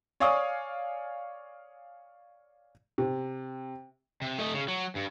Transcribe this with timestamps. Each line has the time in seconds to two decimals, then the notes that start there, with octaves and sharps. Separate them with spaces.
0.20 C#5 D5 F5 G#5 C#6 D#6
2.98 C3
4.22 C3
4.39 A3 D#5
4.54 C#3
4.68 F#3
4.95 G2